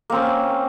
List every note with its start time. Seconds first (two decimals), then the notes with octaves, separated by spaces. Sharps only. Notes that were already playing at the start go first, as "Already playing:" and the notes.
0.10 A#3
0.12 C4
0.15 C#4